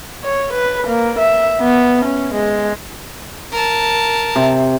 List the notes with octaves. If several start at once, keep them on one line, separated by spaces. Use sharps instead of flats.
C#5
B4
A#3
E5
B3
C#4
G#3
A#4 A5
C3